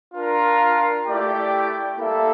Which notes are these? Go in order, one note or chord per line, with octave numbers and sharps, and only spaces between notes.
D4 F4 A#4
A3 E4 G4 D5 G5
G3 A#3 E4 A4 E5